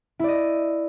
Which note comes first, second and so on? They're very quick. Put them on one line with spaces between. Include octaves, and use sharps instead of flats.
E4 D5 D#5